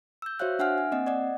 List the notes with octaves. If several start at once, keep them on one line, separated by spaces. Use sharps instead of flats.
E6 G6
F#4 C5 C#5 E5 F5 F#6
D4 E5 F#5 G#5 F6
G#5
A#3 C4 D#5 F#5
D5 D#5 F#5